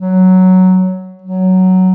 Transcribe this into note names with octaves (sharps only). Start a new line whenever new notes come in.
F#3
F#3